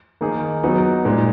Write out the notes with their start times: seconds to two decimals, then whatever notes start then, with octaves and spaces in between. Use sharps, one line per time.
0.21 D#3 A#3 D#4 G#4
0.63 F#3 B3 D#4 F#4
1.05 A#2 G#3 D#4